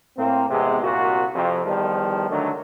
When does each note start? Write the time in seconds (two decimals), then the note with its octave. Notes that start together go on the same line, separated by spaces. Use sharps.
0.17 A2 A#3 C4
0.49 E2 C3 G#3 B3 G4
0.82 C2 A#2 F#4
1.34 F2 C3
1.65 E2 D#3 F3 G3
2.29 D3 D#3 F#3 A3 D4